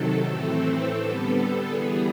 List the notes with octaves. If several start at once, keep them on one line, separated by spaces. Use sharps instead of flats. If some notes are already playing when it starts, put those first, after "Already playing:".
Already playing: C3 D#3 F#3 A4
A2 E3 A3 C4
D3 G3 B3
E3 G3 B3 G#4